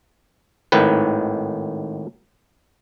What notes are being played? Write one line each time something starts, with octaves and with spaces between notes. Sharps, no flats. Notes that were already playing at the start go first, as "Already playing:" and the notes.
G#1 A2 D#3 B4